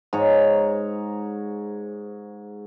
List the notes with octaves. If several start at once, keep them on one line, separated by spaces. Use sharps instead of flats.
G#2 C#5 A#5